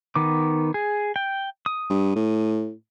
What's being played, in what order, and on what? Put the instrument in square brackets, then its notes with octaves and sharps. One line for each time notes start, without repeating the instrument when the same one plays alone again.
[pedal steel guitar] D#3 B3 D6
G#4
G5
D#6
[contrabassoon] G2
A2